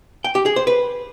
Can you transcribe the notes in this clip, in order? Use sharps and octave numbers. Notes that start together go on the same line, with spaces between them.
G5
G4
G#4
C5
B4